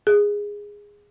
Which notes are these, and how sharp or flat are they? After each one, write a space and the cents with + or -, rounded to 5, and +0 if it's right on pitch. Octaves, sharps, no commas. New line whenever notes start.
G#4 -15